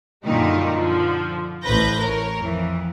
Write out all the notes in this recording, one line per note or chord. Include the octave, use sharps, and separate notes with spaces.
F#2 A#2 D3 D#3 G3 D#4
D3 F3
A1 B4 C5 G6 A#6
A#4 C#5
F2 E3